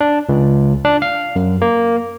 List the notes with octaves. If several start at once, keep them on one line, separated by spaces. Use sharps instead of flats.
D4
C#2
D4
F5
F#2
A#3